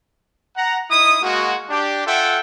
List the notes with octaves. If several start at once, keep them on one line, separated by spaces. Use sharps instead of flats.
F#5 A#5
D#4 E4 D#6
G#3 A#3 F#4
D4 G4
F4 A4 E5 F#5 G5